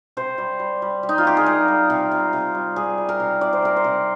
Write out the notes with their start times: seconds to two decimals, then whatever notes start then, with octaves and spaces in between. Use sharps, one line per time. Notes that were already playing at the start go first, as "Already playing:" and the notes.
0.17 C3 C5
0.38 G3
0.60 G3
0.82 G3
1.03 G3
1.09 D#4
1.18 F4
1.25 C3 G4
1.37 G#4
1.46 G3 A#4
1.68 G3
1.90 C3
2.11 C3
2.33 C3
2.54 G3
2.76 G3 G#4
2.98 G3
3.09 A#4
3.20 C3
3.41 C3 D5
3.53 C5
3.62 C3 A#4
3.77 C5
3.84 C3